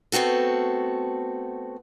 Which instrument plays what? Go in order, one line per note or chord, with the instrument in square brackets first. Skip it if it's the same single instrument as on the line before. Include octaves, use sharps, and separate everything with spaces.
[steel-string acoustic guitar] A3 B3 C4 F#4 A4